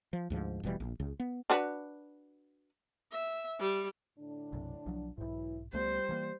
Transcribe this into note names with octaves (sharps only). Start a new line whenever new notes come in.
F3
D2 G#2 F3
F1 B2 E3 G3
A#1
C#2 C#3
B3
D4 F#4 B4
E5
G3
A2 D3 D4
B1 F#2 C3
B1 F3 F#3
B1 G#2 E3 F#3 E4
C#2 G3 A3 B3 C5
E3 F3 A#3